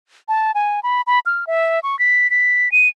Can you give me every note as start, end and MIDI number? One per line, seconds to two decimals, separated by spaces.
0.28 0.52 81
0.55 0.80 80
0.83 1.01 83
1.07 1.19 83
1.26 1.47 89
1.47 1.80 76
1.83 1.98 85
1.99 2.30 95
2.30 2.71 95
2.72 2.88 99